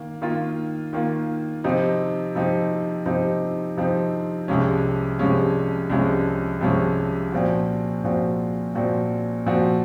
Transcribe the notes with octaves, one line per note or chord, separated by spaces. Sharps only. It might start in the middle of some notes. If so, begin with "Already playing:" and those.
Already playing: D#3 A#3
D#3 A#3 F4
D#3 A#3 F4
C3 F3 C4 D#4
C3 F3 C4 D#4
C3 F3 C4 D#4
C3 F3 C4 D#4
C2 C3 F3 G#3 C#4
C2 C3 F3 G#3 C#4
C2 C3 F3 G#3 C#4
C2 C3 F3 G#3 C#4
A#2 F3 C4 F#4
A#2 F3 C4 F#4
A#2 F3 C4 F#4
A#2 F3 C4 F#4